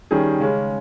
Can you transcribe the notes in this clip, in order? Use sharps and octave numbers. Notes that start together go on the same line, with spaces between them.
D#3 G3 C#4 G#4
C#3 G#3 C#4